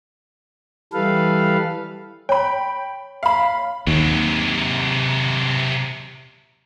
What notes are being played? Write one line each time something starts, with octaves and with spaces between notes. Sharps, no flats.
E3 G3 A4 B4 F5
C#5 G5 B5
F5 B5
D#2 C3 F#3